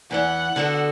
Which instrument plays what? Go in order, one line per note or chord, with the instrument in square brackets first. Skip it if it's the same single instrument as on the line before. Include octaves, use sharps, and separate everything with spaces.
[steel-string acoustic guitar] E2 E3 B3 [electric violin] F#5
[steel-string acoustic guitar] D3 B3 F#4 A4